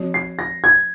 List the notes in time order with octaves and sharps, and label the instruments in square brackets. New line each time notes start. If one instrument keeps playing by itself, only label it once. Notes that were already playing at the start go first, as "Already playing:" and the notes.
Already playing: [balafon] F3 C4 F#4 C#5
[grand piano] C7
A#6
G#6